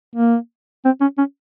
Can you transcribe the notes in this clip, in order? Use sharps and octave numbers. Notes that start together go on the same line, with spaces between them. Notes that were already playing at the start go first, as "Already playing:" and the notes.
A#3
C4
C#4
C#4